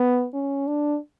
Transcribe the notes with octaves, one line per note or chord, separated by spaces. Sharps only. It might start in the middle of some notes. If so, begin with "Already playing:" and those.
Already playing: B3
C#4
D4